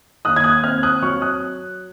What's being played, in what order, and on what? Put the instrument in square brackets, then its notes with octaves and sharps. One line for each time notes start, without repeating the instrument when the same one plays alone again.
[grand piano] D#2 D#6 F#6
G#6
D#6 F#6
C4 F6 G#6
D#6 F#6
F#3 C#6 F6
D#6 F#6